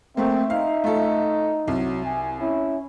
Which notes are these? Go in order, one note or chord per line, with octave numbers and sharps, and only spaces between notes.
A3 A#3 C4 E5
D#4 F5
A3 F4 A4
C2 F#3
G#5
C#4 E4